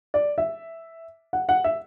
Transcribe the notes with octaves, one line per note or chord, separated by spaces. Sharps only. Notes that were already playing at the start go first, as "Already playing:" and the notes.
D5
E5
F#5
F#5
E5